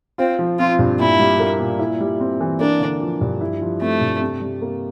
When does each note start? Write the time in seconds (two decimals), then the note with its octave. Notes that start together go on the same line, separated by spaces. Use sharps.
0.18 C4 F4
0.39 F3
0.59 C4 F4
0.79 G2
1.00 A#2 E4
1.20 G3
1.40 A#3
1.59 A#2
1.79 E4
2.00 G3
2.21 C4
2.41 E3
2.60 A#3 D4
2.80 D3
3.01 F3
3.21 G2
3.41 E4
3.61 F3
3.81 A3 C4
4.01 G2
4.22 C3
4.41 G3
4.61 A#3